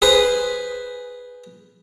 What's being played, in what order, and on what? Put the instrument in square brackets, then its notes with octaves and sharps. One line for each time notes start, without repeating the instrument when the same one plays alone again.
[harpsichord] G#4 B4 C5